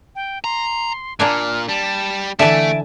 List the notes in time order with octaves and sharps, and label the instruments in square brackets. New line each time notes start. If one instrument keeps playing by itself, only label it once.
[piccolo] G5
[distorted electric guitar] A#5 [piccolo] C6
[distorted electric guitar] A#2 [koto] A#3 D4 G#5 [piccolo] F6
[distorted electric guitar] G3 [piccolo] A5
[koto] D3 E3 [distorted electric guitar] A3 [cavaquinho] E5 G#5 A5 [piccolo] D7